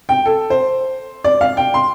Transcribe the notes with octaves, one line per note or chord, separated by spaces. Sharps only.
G5
A4
C5
D5
F5
G5
C6